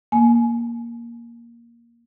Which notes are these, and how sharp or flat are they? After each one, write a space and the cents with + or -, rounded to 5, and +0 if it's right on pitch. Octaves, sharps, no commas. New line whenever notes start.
A#3 +10 G#5 +25